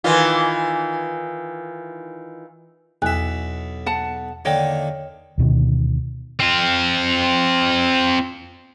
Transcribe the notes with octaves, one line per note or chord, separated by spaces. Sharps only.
D#3 E3 F4
B1 E2 E5 G#5 F#6
F#5 A5
D3 D#3 A#3 C#5 D#5 G5
D2 B2 D#3
C4 F4